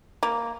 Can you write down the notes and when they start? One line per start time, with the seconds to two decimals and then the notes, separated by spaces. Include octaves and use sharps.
0.23 A#3